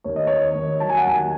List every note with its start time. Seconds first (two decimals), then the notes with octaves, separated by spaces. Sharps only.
0.04 D#2 C#5
0.16 D#5
0.27 D#3 C#5
0.55 D#2
0.80 F#3 A5
0.89 G#5
0.98 F#5
1.06 D#2 G#5